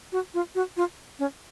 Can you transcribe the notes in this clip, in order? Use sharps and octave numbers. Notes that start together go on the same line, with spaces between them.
F#4
F4
F#4
F4
C#4